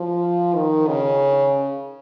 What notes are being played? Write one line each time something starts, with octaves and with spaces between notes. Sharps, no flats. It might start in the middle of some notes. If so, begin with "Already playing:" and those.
Already playing: F3
D#3
C#3